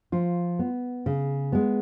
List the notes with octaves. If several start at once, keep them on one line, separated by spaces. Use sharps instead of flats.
F3 F4
B3
C#3
G#3 B3